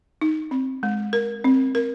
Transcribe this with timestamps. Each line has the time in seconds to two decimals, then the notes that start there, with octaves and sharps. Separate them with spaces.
0.21 D#4
0.51 C4
0.83 G#3
1.13 A#4
1.44 C4
1.75 A#4